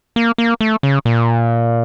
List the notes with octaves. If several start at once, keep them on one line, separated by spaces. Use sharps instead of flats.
A#3
A#3
A3
C#3
A#2